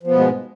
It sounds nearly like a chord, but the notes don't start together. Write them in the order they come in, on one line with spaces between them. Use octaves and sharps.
F3 B3 B2 G#3 G#2